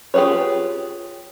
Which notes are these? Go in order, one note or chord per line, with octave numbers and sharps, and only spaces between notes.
F4 G4 G#4 B4 C#5